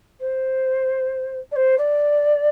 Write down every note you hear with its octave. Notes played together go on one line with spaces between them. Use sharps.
C5
D5
C5
D5